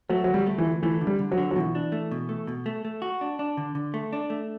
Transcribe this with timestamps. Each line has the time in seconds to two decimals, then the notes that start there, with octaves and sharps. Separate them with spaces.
0.09 F#3 A3
0.24 D2 F#3
0.34 G3
0.47 A3
0.58 E3
0.65 D2
0.83 E3 A3
1.01 D3
1.07 G3
1.19 D3
1.32 F#3
1.38 D3
1.51 F#3
1.56 B2 E3
1.75 D4
1.92 A3
2.11 B2
2.29 A3
2.47 B2
2.66 A3
2.85 A3
3.02 F#4
3.21 D4
3.39 D4
3.57 D3
3.75 D3
3.94 A3
4.13 D4
4.30 A3